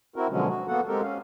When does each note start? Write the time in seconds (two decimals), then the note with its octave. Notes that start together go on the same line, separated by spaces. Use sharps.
0.16 C4 E4 F#4 A#4
0.30 B2 D3 F3 F#3 G#3 C#4
0.48 F#4
0.68 A#3 B3 F#4 A4 F#5
0.88 G#3 C4 G4 A4 A#4
1.02 C#4 F5